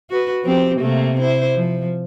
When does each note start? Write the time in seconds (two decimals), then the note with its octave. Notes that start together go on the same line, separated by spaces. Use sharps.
0.10 F#4 B4
0.44 F3 C4 G4
0.80 C3 A3 A#3
1.20 E4 C5
1.55 F3